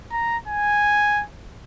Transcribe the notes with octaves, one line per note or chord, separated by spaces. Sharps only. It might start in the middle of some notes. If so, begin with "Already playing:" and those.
A#5
G#5